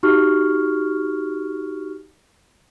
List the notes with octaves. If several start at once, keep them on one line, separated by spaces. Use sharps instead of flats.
D#4 F#4 G4 C#6 F6